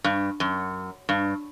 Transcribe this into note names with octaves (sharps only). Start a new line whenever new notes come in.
G2
F#2
G2